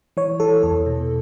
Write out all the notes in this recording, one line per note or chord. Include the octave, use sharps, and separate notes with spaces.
E3 C#5
E3 A4
E2 A4
B2